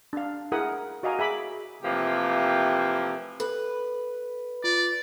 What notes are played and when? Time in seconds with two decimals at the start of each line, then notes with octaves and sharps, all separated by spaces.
0.13 D4 F5
0.52 E4 G#4 A#4 F#5 D#6
1.03 F#4 D5 D#5 F5 G#5 A#5
1.19 G#4 E5 B5 D6
1.83 C3 E3 F3 A3 A#3 G4
3.40 A4 B4
4.64 F4 D5